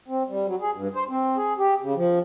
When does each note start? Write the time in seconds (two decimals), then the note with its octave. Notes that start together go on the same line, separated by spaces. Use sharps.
0.08 C4
0.28 G3
0.47 F#3
0.61 G#4
0.74 G2
0.95 C5
1.09 C4
1.37 G#4
1.58 G4
1.82 C#3
1.96 F3